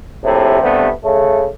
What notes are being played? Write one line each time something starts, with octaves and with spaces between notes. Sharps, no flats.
A#1 A2 C3
G2 C3 A3 B3
C#3 A3